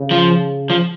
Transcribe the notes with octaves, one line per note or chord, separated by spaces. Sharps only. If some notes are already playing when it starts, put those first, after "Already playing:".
Already playing: C#3
F3
F3